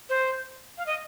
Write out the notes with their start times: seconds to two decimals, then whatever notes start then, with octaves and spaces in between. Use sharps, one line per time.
0.09 C5
0.78 F5
0.86 D#5